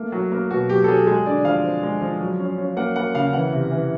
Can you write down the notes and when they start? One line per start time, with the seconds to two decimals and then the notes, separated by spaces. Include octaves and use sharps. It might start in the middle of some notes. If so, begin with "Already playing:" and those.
Already playing: A3 A#3
0.12 F#3
0.32 A#3
0.51 B2 F#4
0.69 F#3 G4
0.84 A4
0.88 F#3 G#4
1.07 G#3 G#4
1.26 D3 D5
1.45 F3 F5
1.64 C4
1.83 G#3
2.01 F3
2.20 F#3
2.40 C#4
2.58 C#4
2.77 A#3 F#5
2.96 A#3 F#5
3.15 C#3 F5
3.33 E3 F#5
3.53 C3
3.72 E3